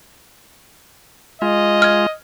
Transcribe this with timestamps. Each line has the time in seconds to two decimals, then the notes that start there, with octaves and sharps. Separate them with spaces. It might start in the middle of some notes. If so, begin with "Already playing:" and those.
1.42 G#3 F4 D#5
1.82 F6 G#6